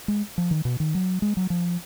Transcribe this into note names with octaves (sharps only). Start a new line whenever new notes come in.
G#3
F3
D#3
B2
D#3
F#3
G#3
F#3
F3